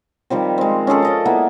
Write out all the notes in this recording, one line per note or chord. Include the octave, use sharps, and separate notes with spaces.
D#3 F3 G3 C4
G#3 C4
C#4 F4 G#4 A4
D5 D#5 D6
A#3 B3 E4